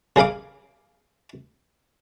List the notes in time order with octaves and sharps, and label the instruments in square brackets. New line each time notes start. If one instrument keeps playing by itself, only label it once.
[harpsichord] C#3 G#4 A#4 F5 D6